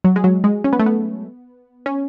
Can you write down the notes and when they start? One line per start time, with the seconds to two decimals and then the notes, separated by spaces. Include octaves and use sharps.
0.04 F#3
0.16 G#3
0.24 F#3
0.44 G#3
0.64 C#4
0.73 B3
0.79 A3
0.86 B3
1.86 C#4